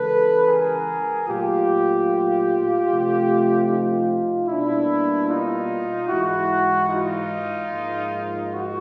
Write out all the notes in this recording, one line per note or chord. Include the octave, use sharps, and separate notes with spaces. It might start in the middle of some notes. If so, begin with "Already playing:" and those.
Already playing: C#3 E3 G#3 A4 B4
G#4 A#4
A#2 F#3 A3 F4 G4
C3 F3 A3
D#4 F4
B2 G3 A#3 D4 E4
D#4 F4
G#2 E3 G#3 E4 F#4
D#4 F4
G#2 F3 A#3
F#4